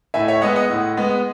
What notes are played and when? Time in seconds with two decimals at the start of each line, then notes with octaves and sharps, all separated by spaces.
0.14 A2 E5 G#5
0.28 C#5 E5
0.42 G#3 B3 D#5 F#5
0.56 D#5 F#5
0.69 A2
0.97 G#3 B3